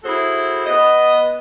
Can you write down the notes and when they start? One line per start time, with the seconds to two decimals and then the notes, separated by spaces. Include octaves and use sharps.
0.04 E4 F#4 G#4 A4 C5
0.66 B3 D#5